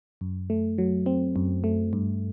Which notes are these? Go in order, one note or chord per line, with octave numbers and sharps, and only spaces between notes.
F#2
A3
F#3
C4
F#2
A3
G2